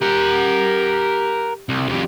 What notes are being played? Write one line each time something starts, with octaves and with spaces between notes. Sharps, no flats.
G4 A#4 F#5
C2
F2 G3